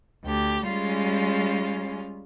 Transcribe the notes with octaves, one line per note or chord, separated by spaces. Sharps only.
D2 G4
G3 G#3 C#4 F4